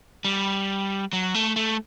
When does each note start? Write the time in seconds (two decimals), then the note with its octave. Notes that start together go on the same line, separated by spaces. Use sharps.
0.25 G3
1.13 F#3
1.34 A3
1.56 A3